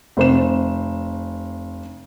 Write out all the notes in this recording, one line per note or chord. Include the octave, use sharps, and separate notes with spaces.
F1 C5 E7